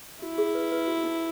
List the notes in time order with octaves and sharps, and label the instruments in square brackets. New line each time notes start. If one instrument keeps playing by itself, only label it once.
[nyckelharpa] E4 [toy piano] F#4
[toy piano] G#4
B4
B4
F#4
D#4